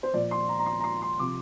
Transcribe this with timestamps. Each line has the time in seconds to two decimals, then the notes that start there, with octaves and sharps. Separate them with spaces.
0.03 C5
0.13 A#2 F3 D5
0.31 C6
0.49 A#5
0.59 A#5
0.66 C6
0.80 A#5
0.84 C6
1.02 C6
1.19 C3 F3 D6